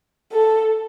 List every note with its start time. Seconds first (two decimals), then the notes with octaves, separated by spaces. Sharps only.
0.32 A4